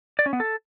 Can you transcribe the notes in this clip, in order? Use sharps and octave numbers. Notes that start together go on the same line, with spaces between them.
D5
C#4
B3
A4